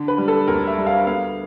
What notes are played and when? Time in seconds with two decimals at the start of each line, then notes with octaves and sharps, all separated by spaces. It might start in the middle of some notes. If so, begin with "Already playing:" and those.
Already playing: D3
0.08 B4
0.18 G3
0.28 A4
0.48 D2 A#4
0.67 E5
0.78 G3
0.86 F5
1.06 B3 F5